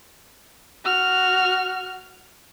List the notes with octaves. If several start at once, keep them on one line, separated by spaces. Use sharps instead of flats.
F#4 F6